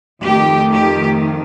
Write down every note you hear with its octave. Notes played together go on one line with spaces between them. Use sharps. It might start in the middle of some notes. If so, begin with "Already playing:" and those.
F2 D#3 A3 G4
G4